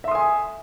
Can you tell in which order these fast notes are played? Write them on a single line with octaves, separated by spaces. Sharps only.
E5 C6 D#6 G#5